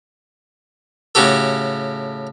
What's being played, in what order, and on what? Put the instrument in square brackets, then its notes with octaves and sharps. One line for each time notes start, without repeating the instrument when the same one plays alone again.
[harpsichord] A2 C#3 F#4 G4 A4